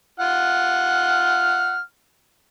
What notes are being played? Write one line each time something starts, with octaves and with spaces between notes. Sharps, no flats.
F4 F#5 F6